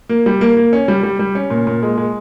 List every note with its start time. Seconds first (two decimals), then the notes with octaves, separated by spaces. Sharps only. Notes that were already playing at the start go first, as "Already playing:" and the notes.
0.09 A#3
0.26 G3
0.41 A#3
0.57 A#3
0.73 C#4
0.88 G3
1.03 G3
1.19 G3
1.35 C#4
1.50 A#2
1.67 A#2
1.83 G#3
1.98 G#3